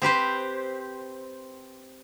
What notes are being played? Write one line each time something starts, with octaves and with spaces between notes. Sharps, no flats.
C4 G4 B4 C5